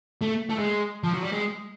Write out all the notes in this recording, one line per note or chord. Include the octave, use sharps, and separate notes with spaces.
A3
A3
G#3
F3
F#3
G3
G#3